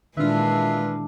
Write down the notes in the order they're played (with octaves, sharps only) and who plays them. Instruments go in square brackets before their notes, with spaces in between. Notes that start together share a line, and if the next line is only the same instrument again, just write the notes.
[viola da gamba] A#2 E3 G#3 [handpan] D#3 D4 [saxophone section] F4 B4 E5